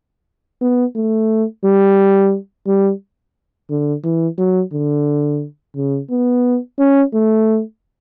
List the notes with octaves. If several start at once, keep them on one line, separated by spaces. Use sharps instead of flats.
B3
A3
G3
G3
D3
E3
F#3
D3
C#3
B3
C#4
A3